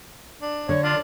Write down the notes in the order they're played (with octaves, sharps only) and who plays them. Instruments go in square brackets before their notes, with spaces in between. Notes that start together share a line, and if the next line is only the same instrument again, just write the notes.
[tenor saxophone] D4
[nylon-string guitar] D3 [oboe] C#5
[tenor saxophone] D4 [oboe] F4